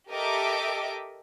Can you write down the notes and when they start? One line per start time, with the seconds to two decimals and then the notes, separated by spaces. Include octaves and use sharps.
0.10 G4 A4 A#4 D#5 E5 D6